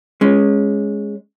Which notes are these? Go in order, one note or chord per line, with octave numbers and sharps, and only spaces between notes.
G#3 C#4